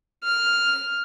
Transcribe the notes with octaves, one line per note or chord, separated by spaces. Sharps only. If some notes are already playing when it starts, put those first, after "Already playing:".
F6